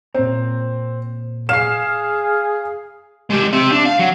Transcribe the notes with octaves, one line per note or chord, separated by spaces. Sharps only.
A#2 C4 C#5 A#5
G#4 F5 C7 E7
G#3 G4
C4 E5
D4
F5
F#3